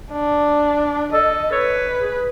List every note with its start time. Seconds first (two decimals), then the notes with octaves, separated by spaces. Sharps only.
0.12 D4
1.13 A4 D#5
1.52 B4 C#5
2.00 G#4